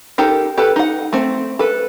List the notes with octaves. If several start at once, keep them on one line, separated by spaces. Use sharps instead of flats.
D#4 G4 A4 A#4
G4 A4 B4
D#4 F#5
A3 C4
A4 B4